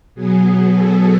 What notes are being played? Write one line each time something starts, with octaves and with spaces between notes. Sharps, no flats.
B2 F#3 B3 G#4
A4